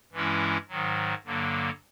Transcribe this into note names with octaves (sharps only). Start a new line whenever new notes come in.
G2 E3 G#3 C#4 E4
G#2 D#3 F#3
G2 D3 F#3 A#3